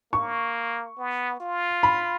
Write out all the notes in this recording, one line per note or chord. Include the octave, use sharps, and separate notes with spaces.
A#3 C#6
B3
F4
B5